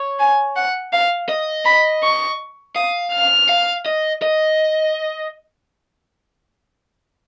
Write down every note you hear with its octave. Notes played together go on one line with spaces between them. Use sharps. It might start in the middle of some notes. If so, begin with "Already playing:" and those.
Already playing: C#5
G#5
F#5
F5
D#5
B5
C#6
F5 D#6
F6
F5
D#5
D#5